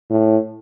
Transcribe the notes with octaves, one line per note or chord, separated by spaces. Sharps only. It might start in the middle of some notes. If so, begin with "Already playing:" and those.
A2